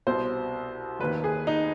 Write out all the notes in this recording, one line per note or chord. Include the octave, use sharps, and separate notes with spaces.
C2 B2 B3 C5
F1 D#2 D#3 B4
G#4
D#4